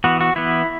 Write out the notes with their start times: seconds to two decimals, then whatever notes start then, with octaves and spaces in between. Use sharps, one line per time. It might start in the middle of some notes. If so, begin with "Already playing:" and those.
0.04 E3 B3 F#4
0.21 F#4
0.36 E3 B3 E4